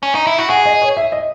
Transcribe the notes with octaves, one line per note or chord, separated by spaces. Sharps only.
C#4
D#4
E4
F#4
G#4 F#5
D#5
C#5
E5
D#5